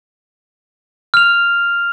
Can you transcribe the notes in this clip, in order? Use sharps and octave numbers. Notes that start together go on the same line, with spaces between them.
F6 F7